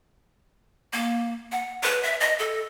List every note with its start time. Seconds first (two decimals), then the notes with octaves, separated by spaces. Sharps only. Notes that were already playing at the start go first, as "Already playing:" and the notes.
0.93 A#3
1.52 F#5
1.83 B4
2.03 E5
2.20 D#5
2.39 A4